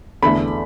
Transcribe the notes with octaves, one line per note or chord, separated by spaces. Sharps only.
E2 D3 A3 E4 B5